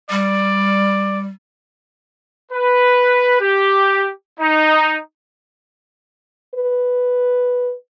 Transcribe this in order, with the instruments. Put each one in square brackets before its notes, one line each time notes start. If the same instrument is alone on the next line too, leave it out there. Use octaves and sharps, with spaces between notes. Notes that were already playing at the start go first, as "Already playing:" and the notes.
[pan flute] G3 [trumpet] D5
[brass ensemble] B4
G4
D#4
[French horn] B4